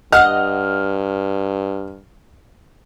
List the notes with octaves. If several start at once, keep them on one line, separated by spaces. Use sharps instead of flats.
G2 D#5 F#5 F6